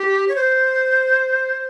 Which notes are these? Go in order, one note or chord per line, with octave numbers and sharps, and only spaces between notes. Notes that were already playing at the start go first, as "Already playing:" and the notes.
Already playing: G4
C#5
C5